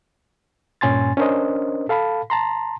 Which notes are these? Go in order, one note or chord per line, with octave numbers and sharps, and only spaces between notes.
G2 A#2 C#4 G#5 C6 A6
C#4 D4 A#4 C5 D#5
A4 F5 A5 B5
A5 A#5 C6